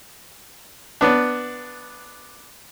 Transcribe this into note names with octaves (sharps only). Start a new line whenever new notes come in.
B3 D4